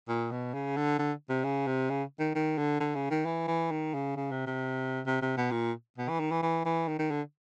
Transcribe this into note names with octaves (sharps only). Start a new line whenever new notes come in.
A#2
B2
C#3
D3
D3
C3
C#3
C3
C#3
D#3
D#3
D3
D3
C#3
D#3
E3
E3
D#3
C#3
C#3
C3
C3
C3
C3
B2
A#2
B2
E3
D#3
E3
E3
E3
D#3
D#3
D3